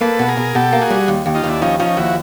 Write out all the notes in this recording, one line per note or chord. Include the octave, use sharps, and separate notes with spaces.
A#3 A4 B4
B2
G#4 A#4
B2
B2 G4 A4
A#3
F#4 G#4
G3
D#2
D#2
D#4 F4
D#2 D4 E4
F3 C#4 D#4
F3 C#4 D#4
D#2 E4 F#4